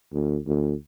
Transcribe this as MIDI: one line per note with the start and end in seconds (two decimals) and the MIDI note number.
0.13 0.38 38
0.47 0.74 38